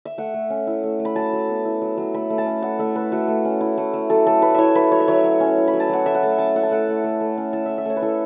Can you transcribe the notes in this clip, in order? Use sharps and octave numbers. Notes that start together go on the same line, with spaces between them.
E5
A3 F#5
A3
C#4
E4
A3
A3
B5
F#3 A5
F#3
B3
E4
F#3
F#3
A3 B5
A3
A5
C#4
E4 F#5
A3 E5
A3 B4
A3 F#4
A3
C#4
E4
A3
A3
F#3 A4
F#3 A4
A3 B4
E4 C#5 E5
F#3 B4
F#3 C#5
E5
F#3 C#5
F#3
C#4
E4
B5
F#3
A5
F#3 F#5
A3 E5
F#5
A3 A5
C#4 A5
E4 F#5
A5
A3 F#5
A3
A3
A3
C#4
E4 A5
A3 E5
E5
A3 C#5
B4
E4 A4